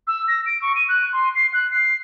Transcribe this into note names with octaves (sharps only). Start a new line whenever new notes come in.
E6
A#6
D7
C#6
D#7
F#6
C6
C7
F#6
C7